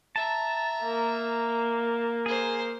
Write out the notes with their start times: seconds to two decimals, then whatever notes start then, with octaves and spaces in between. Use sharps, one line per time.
0.16 E5 A5 A#5
0.83 A#3
2.26 G#4 A#4 C5